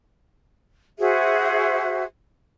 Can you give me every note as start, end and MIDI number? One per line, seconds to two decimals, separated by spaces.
1.00 2.04 66
1.00 2.04 68
1.00 2.04 72
1.00 2.04 76